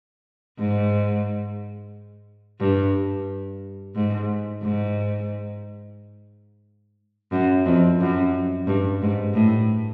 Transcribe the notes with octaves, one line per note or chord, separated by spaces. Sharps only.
G#2
G2
G#2
G#2
F#2
F2
F#2
G2
G#2
A2